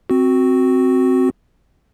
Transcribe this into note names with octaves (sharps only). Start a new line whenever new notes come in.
C4 F#4